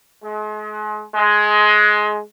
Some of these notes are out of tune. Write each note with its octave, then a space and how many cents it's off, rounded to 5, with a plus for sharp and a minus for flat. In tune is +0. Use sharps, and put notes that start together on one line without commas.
G#3 +40
G#3 +15